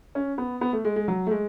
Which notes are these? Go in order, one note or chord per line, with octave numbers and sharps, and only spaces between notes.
C#4
B3
B3
A3
G#3
G#3
F#3
A3
G#3